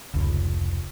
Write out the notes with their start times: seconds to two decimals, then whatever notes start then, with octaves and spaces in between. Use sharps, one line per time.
0.14 F1 C#2